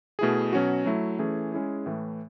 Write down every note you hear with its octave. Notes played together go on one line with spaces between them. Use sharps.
B2 A3 E4 G#4
B2 F#3 C#4 F#4
F#3 A3 E4
E3 A3 C#4 G#4
G#3 C#4 E4 G#4
A2 E3 A3